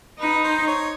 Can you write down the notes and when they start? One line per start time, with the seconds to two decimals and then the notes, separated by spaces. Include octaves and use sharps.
0.20 D#4 B4
0.44 C5
0.67 C#5